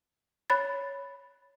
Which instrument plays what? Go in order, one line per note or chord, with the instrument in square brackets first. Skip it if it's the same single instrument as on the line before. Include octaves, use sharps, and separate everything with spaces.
[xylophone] C#5 B5 A6